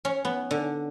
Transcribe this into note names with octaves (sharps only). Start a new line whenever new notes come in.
C#4
B3
D3